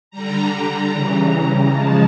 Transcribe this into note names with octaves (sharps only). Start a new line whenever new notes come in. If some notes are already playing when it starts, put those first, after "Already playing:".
D3 G3 A#5
A#5
C#3 E3 G3
C#3 F3 G#3 A5